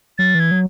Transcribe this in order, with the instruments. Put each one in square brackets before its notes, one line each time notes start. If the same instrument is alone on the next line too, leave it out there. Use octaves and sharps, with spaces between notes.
[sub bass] F#3 [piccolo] A6
[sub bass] E3 [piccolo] G#6
[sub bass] F#3